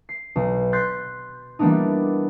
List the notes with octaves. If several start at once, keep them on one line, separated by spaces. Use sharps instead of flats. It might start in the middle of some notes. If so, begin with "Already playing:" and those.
C7
B1
C6 F#6 G6 A6 B6 C7
E3 G3 A#3 B3 D4 D#4